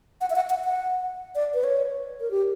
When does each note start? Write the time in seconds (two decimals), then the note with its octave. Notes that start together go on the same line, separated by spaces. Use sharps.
0.21 F#5
0.30 E5
0.36 F#5
0.50 F#5
0.65 F#5
1.35 D5
1.54 B4
1.64 C#5
2.20 A#4
2.31 G4